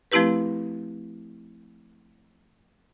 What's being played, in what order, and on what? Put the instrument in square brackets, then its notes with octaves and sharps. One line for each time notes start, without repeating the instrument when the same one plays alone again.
[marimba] F3 A3 C4 E4 G4 B4